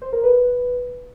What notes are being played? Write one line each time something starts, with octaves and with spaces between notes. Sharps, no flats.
C5
A#4
B4